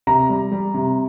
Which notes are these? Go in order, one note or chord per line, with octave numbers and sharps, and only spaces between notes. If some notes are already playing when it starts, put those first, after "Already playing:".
C3 A#5
G3
G3
C3